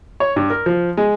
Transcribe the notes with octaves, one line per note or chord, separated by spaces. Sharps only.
C#5
G2
A#4
F3
G#3